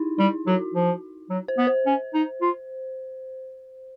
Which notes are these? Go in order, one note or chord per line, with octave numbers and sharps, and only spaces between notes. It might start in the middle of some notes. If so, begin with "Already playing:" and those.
Already playing: D#4 E4
G3 E4
F#3 F#4
F3
F#3
C5
B3
C5
C#4
D#4
F4